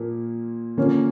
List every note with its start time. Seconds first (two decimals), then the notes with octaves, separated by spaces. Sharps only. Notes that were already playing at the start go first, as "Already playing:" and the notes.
Already playing: A#2 F3 A#3
0.77 D3 F3 A#3 C#4